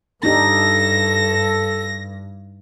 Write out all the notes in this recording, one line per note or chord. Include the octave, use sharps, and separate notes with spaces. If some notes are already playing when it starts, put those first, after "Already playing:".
G2 D4 D#4 G4 A4 A#6